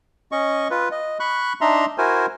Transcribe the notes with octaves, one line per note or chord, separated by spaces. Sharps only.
C#4 D#5 C#6
F4 B4
D#5
B5 C#6 F#6
D4 D#4 E5 A#5 C6
E4 F#4 A#4 C5 G#5